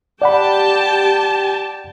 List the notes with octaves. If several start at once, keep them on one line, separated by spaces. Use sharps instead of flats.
G4 D5 F#5 G5 A5 B5